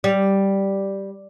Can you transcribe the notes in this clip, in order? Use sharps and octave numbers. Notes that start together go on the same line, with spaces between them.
G3